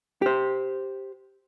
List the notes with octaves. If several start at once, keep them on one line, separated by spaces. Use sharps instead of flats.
G4 C5